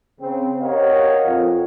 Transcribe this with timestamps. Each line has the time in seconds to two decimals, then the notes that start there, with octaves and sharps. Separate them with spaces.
0.19 C#3 C4
0.62 G4 A#4 C#5 D#5 F5 F#5
1.26 F2